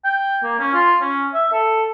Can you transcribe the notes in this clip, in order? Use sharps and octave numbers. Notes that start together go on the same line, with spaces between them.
G5
A#3
C#4
F4
C#4
E5
A4